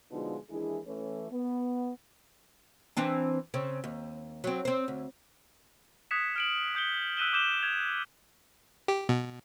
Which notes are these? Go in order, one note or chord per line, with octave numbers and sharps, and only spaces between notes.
B2 D3 F3 G#3 D#4 F4
D#2 E3 G#3 D4 E4 G#4
E3 A3 C#4
B3
E3 C4 D4
C#3 C4
D#2
F#3 C4
C4 C5
D2
D#6 F#6 G#6 B6 C#7 E7
F6 D7 F#7
D#6 G6 C#7 G7
E6 F#6 B6 D#7 E7 G7
D6 G6 E7 G7
G6 G#6 F7
G4
B2